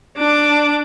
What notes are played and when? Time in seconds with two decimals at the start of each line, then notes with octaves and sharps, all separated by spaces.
0.18 D4 D6